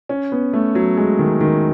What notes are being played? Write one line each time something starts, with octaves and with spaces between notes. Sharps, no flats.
C#4
B3
A3
F#3
G#3
D#3
D#3